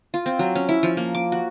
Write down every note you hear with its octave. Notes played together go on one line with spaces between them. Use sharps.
F4
C4
F#3
C#4
E4
F3
A#3
D6
F#4